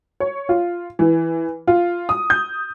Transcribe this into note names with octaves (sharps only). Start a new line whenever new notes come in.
C#5
F4
E3
F4
D#6
G6